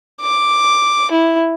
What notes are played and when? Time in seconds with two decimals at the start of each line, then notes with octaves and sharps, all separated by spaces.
0.21 D6
1.11 E4